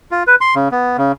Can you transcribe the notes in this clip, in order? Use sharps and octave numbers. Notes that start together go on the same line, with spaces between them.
F4
B4
C6
C#3
B3
C#3